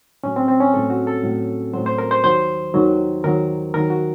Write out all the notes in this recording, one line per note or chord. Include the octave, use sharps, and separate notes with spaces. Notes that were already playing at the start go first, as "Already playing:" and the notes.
A2 F#3 C#4
C4
C4
C#4
A2 F#3 A4
F#4
A4
A2 F#3
A2 F#3 C5
C5
A#4
C5
D#2 D#3 F#3 C5
D#2 D#3 F#3
D#2 D#3 F#3 A#4
D#2 D#3 F#3 A#4
F#4